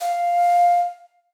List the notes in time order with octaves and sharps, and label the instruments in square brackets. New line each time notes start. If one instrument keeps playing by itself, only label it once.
[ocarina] F5